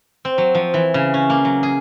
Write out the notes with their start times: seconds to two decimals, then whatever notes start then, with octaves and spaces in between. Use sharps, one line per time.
0.25 C4
0.38 F#3
0.55 F3
0.74 E3
0.94 C#3
1.14 C#4
1.30 A#3
1.45 F#3
1.63 G#4